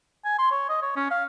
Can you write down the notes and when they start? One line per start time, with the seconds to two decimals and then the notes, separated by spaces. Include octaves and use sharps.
0.25 G#5
0.39 C6
0.51 C#5
0.69 D#5
0.82 C#5
0.96 C#4
1.11 F5